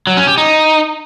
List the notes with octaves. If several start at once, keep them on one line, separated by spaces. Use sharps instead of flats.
F#3
C#4
G4
D#4